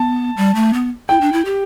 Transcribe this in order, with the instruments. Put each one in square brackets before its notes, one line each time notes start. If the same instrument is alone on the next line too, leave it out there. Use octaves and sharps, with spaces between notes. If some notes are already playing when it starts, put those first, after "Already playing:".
Already playing: [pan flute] B3 [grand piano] A5
[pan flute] G3
A3
B3
[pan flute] E4 [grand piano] G5
[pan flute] D4
E4
G4